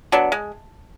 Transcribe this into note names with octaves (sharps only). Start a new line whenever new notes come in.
F#3 B3 D4
G#3